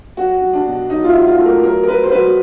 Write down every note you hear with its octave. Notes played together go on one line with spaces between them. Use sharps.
F#3 F#4
F#3
D4
B2
F#3 D#4
F4
E4
F#3
F4
A3
A#4
F#3 A#4
A#4
F#3 B4
C5
F#3 B4